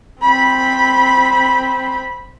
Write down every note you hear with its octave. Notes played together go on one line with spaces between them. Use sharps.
C4 B5